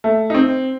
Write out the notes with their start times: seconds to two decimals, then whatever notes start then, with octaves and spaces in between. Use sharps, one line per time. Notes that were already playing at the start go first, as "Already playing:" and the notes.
0.04 A3
0.30 D#4
0.35 C4